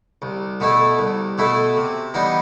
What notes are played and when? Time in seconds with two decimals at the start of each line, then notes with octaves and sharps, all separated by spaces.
0.22 C2
0.60 B2 A3 E4 A4
0.99 C2
1.38 B2 A3 E4 A4
1.76 C3
2.14 E3 G3 B3 D#4